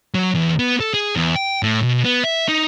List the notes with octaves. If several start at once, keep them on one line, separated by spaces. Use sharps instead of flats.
F#3
E2
B3
A4
G#4
E2
G5
A2
B2
B3
E5
D#4